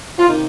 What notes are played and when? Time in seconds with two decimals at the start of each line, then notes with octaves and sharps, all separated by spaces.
0.19 F4
0.28 C3 D#3 A#3 D#4